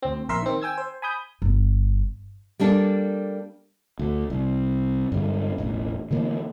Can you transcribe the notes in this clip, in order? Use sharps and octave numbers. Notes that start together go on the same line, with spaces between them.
D2 C4
A#1 A#4 E5 C6 E6
D#3 C4
G5 G#5 E6 G#6
C5
G#5 B5 D#6 G6
G1
G3 A#3 D4 A4
D2
C2
G2 D3 G#3
E1 A1
D3 E3 A#3